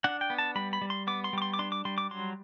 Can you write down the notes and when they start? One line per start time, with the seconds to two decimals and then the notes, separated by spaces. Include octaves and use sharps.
0.04 D4 F#5
0.21 G5
0.30 B3
0.38 A5
0.55 G3 B5
0.73 B5
0.82 G3
0.90 C6
1.07 B3 D6
1.24 C6
1.33 G3 D6
1.42 C6
1.54 D6
1.59 D4 C6
1.72 D6
1.85 G3 C6
1.98 D6
2.11 F#3 C6